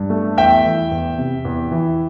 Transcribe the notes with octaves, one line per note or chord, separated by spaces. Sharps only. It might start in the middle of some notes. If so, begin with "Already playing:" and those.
Already playing: G2
A3
E2 E5 G5
E3
E2
C3
E2
E3